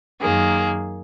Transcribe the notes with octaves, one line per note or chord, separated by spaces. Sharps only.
F#2 D#3 A#3 G#4